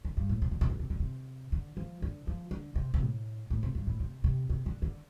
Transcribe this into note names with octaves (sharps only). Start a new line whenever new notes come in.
D3
G2
A2
C3
D3
C3
D3
C3
D3
C3
D3
F3
D3
F3
D3
C3
C3
A2
A2
C3
G2
A2
C3
C3
C3
D3
D3